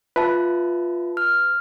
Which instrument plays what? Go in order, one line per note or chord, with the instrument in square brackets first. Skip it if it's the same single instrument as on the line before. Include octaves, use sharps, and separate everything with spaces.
[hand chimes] F4 E5 A5 [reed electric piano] B4
[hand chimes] F6